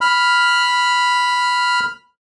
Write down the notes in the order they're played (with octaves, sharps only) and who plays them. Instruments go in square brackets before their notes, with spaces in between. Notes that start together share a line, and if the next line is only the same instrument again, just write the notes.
[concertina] B5 F6